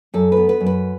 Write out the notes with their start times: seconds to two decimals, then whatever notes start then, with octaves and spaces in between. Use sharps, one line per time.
0.14 F#2 A4
0.32 B3 B4
0.49 B4
0.60 F#2
0.66 B4